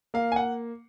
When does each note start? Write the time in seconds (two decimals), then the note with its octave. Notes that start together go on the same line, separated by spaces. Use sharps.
0.14 A#3 F5
0.32 G#5
0.36 F#5